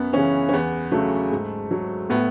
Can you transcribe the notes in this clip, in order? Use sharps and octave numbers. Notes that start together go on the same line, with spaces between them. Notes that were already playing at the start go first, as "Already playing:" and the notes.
Already playing: F#2 B3
C#3 E3 C#4
C#4
E2 B3
C#3 F#3 A3
G#2
F#3
A2 B3